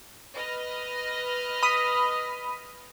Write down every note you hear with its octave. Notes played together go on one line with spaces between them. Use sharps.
B4 D#5 F6
B5 D#6